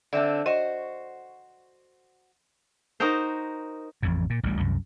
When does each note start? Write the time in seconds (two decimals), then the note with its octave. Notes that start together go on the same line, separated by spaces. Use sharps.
0.13 D3 C4 D4 D5 E5
0.46 F#4 C5 D#5
3.00 D#4 F#4 A#4 C5
4.02 A1 F2 A2
4.30 A#2
4.43 A1 D2 G3
4.60 C2 F#2